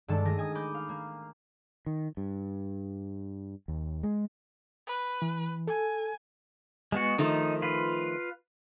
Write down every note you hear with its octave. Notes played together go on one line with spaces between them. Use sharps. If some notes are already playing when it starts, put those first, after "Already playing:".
G2 D#3 G#3 A4 D5 A5
D#3 A3 G4 G#4 A#6
D#5 G#5 D#6
B5 D6 D#6 G6
F5
A#3
D#3
G2
D#2
G#3
B4
E3
A4 G#5
G#3 B3 F#4
D#3 F3 A3 D#4
F4 B4